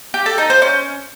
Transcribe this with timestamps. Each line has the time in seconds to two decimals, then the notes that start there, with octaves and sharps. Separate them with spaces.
0.14 G4
0.26 A4
0.38 D#4
0.50 C5
0.62 C#4